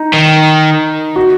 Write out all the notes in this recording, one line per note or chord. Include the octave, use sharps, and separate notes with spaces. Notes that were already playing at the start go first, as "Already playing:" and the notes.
Already playing: D#4
D#3
F#4